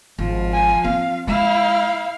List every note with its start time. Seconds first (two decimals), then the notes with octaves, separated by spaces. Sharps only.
0.18 G#1 F3
0.53 G#5
0.84 C4 F5
1.27 G#3 E4 F5